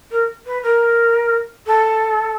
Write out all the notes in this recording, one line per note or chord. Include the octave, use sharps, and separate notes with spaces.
A#4
B4
A#4
A4